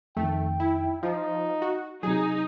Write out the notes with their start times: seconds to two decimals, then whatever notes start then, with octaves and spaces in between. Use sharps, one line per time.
0.17 F2 D#3 A3 G5
0.60 E4
1.03 F3 D#4 F5
1.62 F#4
2.03 C3 F#3 D#4 G#4